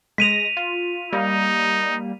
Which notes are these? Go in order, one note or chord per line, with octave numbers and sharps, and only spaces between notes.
G#3 A#6 B6 D#7 F7
F4
G3 A#3 D#4